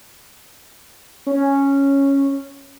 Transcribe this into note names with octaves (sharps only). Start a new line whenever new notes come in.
C#4